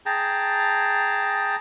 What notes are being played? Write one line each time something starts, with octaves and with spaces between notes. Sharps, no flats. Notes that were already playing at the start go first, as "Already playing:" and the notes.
G#4 G5 A5 A#5